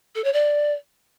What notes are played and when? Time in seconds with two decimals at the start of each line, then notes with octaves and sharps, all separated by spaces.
0.15 A4
0.24 C#5
0.33 D5